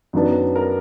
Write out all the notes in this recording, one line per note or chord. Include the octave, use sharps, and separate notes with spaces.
F#2 D#3 F#3 B3 D4
A#4